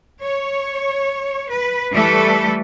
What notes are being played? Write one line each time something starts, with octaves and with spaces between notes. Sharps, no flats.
C#5
B4
E3 G3 A3 A4 B4